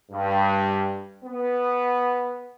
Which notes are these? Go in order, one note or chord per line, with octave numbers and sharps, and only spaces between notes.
G2
B3